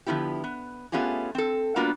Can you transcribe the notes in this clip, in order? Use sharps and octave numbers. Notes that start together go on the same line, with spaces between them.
D3 F3 B3 E4 G4
B3
A3 B3 C#4 F4 G4 G#4
C4 A4
G3 A#3 B3 D4 F4 F#4